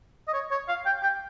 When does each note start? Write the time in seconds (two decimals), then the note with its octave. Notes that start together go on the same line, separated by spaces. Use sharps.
0.28 D#5
0.34 C#5
0.51 C#5
0.68 F5
0.86 G5
1.03 G5